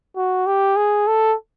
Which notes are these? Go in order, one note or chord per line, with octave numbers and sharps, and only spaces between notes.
F#4
G4
G#4
A4